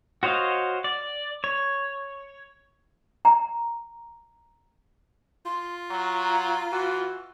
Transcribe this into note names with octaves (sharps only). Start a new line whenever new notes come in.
F#4 C5 C#5 D#5 F5
D5
C#5
A#5
F4 C6
F#3 A#5
E3 F#4